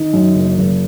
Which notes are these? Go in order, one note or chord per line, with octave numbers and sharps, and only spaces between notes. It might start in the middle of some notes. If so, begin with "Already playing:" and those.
Already playing: D#3 D#4
F#2
F#1
F#1